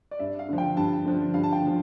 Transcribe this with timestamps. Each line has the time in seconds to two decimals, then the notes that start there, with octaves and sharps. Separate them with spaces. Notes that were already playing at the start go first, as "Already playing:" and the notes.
0.11 D5
0.19 G2 E5
0.39 F5
0.49 D3 F3
0.58 G5
0.77 G2 A5
1.05 D3 F3
1.34 G2 F5
1.43 A5
1.53 G5
1.62 D3 F3